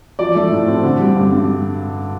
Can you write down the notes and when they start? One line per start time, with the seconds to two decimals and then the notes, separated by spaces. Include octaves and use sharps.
0.19 F3 D5
0.35 A3
0.51 A2
0.67 C4
0.83 D3
0.99 G3
1.16 G2
1.32 G2